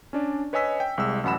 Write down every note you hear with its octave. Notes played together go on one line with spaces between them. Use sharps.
C#4 D4 D5
B4 C#5 D#5 G#5 E6 B6
G5
C2 G#3 E6
A1 F#2 F#5 B5 E7